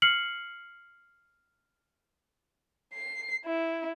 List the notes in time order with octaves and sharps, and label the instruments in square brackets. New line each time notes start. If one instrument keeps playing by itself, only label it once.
[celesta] F6 C7 C#7 F#7
[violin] C7
E4